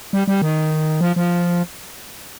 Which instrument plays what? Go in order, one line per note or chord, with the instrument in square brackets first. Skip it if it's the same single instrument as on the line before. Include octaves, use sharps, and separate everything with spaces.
[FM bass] G3
G3
D#3
F3
F3